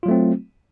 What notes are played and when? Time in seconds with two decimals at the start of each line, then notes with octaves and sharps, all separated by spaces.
0.03 F4
0.06 F#3
0.08 A3
0.11 C4